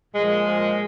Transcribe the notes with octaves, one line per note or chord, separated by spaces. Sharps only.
A#2 F3 G#3
A#2 F3